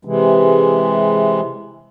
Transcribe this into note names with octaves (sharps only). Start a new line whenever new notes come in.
C3 E3 G#3